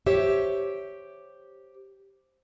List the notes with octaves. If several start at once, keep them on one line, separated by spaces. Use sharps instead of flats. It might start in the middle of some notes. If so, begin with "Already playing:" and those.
G4 C5 C#5 E5